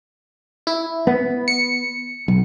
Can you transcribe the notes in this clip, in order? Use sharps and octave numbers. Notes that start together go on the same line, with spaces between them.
E4
B3
C#7
B1